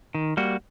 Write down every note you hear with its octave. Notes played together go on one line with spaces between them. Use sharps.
D#3
G3 A#3 F#4